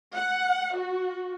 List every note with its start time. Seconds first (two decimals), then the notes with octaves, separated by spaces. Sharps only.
0.14 F#5
0.76 F#4